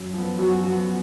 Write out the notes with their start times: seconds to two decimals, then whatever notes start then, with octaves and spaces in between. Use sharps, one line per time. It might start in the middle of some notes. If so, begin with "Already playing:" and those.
Already playing: F#2
0.14 F3 B3
0.39 F#2 F#4
0.62 F3 B3